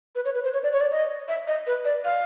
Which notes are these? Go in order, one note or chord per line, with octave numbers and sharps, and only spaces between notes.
B4
C#5
B4
C5
C#5
D5
C#5
D5
D#5
E5
D#5
B4
D5
F5